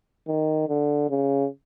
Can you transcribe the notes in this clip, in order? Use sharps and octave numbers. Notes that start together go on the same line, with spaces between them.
D#3
D3
C#3